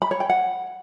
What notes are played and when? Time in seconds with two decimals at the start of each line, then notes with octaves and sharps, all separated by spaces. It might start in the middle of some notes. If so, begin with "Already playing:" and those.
0.02 B5
0.11 C#5
0.20 G5
0.30 F#5